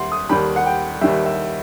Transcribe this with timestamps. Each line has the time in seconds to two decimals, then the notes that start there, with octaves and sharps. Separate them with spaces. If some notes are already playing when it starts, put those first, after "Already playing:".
Already playing: D#2 G3 E5 F#5 C6
0.12 D#6
0.29 D#2 D#3 G3 B5
0.56 F#5
0.66 G5
1.01 D#2 D#3 G3 E5
1.26 E5